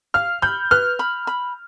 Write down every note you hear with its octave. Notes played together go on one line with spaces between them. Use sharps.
F5 F6
B5 G6
B4 F6
B5
B5